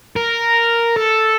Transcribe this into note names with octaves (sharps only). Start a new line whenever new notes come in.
A#4
A4